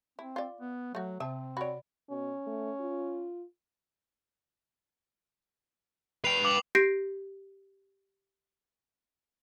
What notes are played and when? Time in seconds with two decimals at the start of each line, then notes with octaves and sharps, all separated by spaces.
0.19 C4 E4
0.36 F4 D5
0.61 B3
0.95 F#3 A3 F#4
1.20 C3 C4 E5 A5
1.57 F#4 C#5 D5 B5
2.10 B2 C#4
2.47 A3
2.80 F4
6.24 B4 G5 C7 F7
6.45 D6 F#7
6.75 G4 G6 A#6 C7 D7